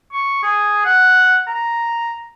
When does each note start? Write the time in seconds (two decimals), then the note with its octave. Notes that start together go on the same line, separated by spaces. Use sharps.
0.13 C#6
0.43 G#4
0.85 F#5
1.47 A#5